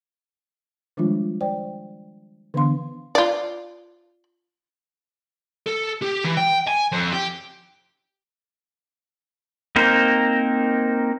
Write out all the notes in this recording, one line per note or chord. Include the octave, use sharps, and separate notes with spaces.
D#3 F3 G3 G#3 D4 F4
C5 D5 G5
D3 E3 B3 D4 F5 C6
F4 D5
A4
G4
E3
G5
G#5
F2
G4
A#3 C4 D#4 A#4 C5